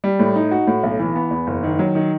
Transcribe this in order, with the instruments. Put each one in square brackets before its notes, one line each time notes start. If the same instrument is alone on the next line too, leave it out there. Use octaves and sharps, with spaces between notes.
[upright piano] G3
A2
D#4
F#4
A2
B1
E3
B3
E2
F#1
D#3
F#3
D#3